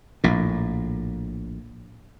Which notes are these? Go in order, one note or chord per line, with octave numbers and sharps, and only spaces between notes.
A#1 A2